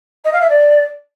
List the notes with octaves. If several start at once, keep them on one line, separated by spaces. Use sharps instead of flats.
D#5
F5
E5
D5